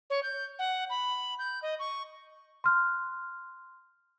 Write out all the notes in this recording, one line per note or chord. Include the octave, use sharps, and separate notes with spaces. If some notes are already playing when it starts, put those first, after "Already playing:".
C#5
G6
F#5
B5
G6
D#5
C#6
C6 F6 F#6